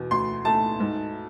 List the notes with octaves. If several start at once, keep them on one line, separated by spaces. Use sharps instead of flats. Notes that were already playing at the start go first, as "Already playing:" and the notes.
Already playing: E2 B2
D2 C6
A3 A5
G#2